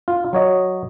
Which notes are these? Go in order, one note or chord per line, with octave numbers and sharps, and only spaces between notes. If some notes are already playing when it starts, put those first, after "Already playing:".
F4
F#3 C#5 D#5